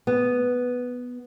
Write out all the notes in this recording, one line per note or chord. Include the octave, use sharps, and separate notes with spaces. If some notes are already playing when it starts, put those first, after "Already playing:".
B3